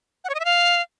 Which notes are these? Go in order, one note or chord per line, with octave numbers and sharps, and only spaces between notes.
F#5
C#5
D#5
E5
F5